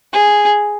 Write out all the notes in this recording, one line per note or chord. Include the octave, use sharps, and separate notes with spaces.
G#4